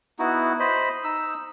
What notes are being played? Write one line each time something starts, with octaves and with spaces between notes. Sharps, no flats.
B3 D#4 E4 F#4
C5 D#5 B5
D#4 E6